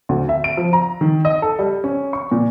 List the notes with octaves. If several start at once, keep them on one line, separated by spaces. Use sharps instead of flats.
D2
E5
D7
F3
A#5
D#3
D#5
A4
G3
C#4
C#6
A#2